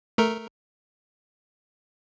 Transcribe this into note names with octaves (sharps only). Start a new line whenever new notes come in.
A3 A#4